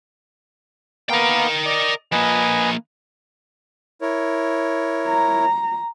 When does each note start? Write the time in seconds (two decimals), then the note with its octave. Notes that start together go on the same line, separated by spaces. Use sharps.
1.09 A#3 B3 A#4 F5 G5
1.65 D5 D#5
2.12 F3 A#3 B4 D#5 G#5
4.01 E4 A#4 C#5
5.07 A#5